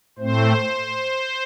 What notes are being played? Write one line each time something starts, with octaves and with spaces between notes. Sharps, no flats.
A2 A3 C4 C5